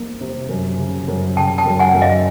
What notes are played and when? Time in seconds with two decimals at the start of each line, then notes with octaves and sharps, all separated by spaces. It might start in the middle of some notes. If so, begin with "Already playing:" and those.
Already playing: F2 F3 A#3
0.21 C3
0.49 F#2
0.78 C#3
1.08 F#2
1.36 C#3 G5 A5
1.58 G5 A5
1.66 F#2
1.79 F#5 G#5
1.95 F#2
2.01 D#5 F5